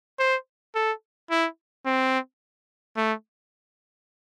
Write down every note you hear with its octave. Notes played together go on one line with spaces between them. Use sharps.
C5
A4
E4
C4
A3